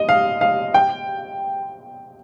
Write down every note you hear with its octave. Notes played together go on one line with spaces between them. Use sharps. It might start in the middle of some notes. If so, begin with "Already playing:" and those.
Already playing: D#5
F5
F5
G5